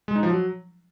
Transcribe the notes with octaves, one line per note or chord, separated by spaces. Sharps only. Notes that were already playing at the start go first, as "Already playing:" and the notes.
G#3
D#4
F3
F#3